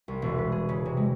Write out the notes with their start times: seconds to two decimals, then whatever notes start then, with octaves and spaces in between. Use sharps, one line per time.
0.08 C2
0.22 E1
0.38 B4
0.52 G#4
0.69 C#3
0.86 C3
0.97 G#3